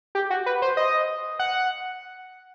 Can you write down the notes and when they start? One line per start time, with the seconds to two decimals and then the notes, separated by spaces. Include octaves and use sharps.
0.15 G4
0.30 F#4
0.46 B4
0.62 C5
0.77 D#5
1.39 F#5